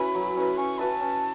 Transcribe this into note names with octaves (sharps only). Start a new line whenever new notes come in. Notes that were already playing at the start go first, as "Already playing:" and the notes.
Already playing: C#4 E4 F#4 A4 B4 B5
F#3
C#4 E4 B4
C#4 C#6
F#4 B4 E5 A5
C#4